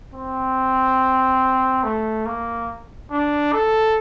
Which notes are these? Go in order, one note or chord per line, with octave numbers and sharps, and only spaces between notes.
C4
A3
A#3
D4
A4